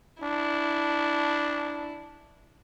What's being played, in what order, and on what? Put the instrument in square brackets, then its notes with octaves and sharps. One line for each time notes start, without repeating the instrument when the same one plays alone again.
[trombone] D4 [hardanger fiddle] E4